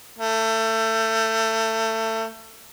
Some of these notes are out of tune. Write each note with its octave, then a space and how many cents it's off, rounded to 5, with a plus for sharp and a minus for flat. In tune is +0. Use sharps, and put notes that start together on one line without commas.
A3 +25